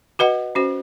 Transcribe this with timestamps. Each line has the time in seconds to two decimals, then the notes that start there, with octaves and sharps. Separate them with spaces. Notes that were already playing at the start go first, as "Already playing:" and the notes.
0.19 F#4 B4 D#5 F#5
0.55 C#4 F#4 C5